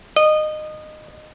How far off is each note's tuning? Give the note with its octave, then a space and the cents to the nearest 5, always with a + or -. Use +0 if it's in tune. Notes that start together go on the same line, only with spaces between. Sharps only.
D#5 -20